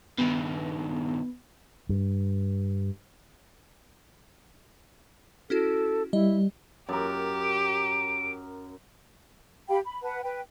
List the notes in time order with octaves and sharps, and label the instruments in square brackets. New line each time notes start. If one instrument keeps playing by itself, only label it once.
[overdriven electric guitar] G2 D#3 [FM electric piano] B3
[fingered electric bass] G2
[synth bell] C#4 E4 F#4 [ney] A4
[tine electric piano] G3 [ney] E4 [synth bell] D#5
[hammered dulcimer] F#2 A#4 [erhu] G4
[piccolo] D7
[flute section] G4 F5 G5 B5
B5
B4 F#5 A5
B4 G5